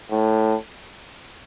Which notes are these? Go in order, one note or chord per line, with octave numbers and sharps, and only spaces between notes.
A2